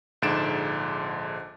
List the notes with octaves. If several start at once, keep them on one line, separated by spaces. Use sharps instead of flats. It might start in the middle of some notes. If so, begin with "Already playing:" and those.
A#1 G#2 D3 A6 D7 E7